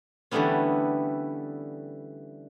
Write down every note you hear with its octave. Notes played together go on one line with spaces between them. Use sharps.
D3 E3 G3 A3 B3 C#4